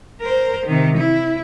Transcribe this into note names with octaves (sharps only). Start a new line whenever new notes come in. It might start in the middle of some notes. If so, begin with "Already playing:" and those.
A#4 C5
C3 D#3
E4